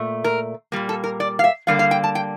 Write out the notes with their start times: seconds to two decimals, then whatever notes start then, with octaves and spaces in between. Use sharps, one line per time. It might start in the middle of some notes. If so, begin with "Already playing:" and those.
Already playing: A#2 A3
0.24 A#4
0.72 A#2 G3 A#3
0.89 A4
1.04 A#4
1.20 D5
1.39 F5
1.44 E5
1.67 D3 G3 A#3 F5
1.79 F5
1.91 G5
2.04 A5
2.15 G5